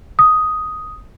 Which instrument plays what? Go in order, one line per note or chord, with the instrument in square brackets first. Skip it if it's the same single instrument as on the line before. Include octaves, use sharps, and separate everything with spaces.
[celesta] D#6